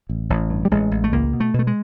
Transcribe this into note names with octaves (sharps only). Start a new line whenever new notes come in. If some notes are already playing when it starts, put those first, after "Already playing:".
A1
A1
G2
G3
A1 G#3
A1
A3
C#2 A#3
B2
A3
B2
A3
G#3